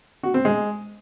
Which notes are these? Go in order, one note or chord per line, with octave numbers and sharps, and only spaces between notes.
F#4
C4
G#3